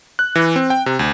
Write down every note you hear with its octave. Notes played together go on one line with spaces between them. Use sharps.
F#6
E3
C4
G5
C3
D2